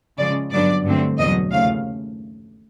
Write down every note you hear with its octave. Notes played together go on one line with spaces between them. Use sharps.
C#3 F3 G#3 D5
G2 D3 F#3 B3 D4 D5
G2 D3 F#3 A3 C4
E2 B2 F#3 D#5
D#2 C#3 F3 A3 F5